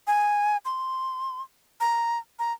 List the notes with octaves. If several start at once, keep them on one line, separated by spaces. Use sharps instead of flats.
G#5
C6
A#5
A#5